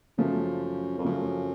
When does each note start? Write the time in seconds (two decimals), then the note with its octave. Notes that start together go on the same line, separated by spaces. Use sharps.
0.18 F#2 C#3 F3 A3
0.98 F2
1.05 F#2 C#3 F3 A3